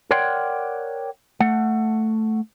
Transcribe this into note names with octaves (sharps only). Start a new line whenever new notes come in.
A#4 C#5 D5 F#5 G5 C6
A3 F#5